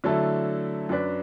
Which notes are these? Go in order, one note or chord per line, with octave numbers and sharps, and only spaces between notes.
D3 F#3 A3 E4 A4
F#2 F#3 D4 B4